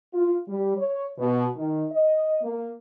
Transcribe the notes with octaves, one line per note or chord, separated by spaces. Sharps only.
F4
G3
C#5
B2
D#3
D#5
A#3